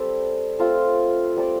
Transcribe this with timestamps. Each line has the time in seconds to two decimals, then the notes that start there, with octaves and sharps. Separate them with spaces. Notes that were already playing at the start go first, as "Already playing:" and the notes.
Already playing: G3 C4 A4
0.59 A3 C4 F4 A4
1.36 G3 C4 A4 D5